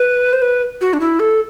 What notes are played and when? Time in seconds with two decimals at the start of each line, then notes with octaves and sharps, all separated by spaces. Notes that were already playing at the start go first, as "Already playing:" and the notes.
Already playing: B4
0.33 C5
0.42 B4
0.81 F#4
0.93 D4
1.00 E4
1.19 A4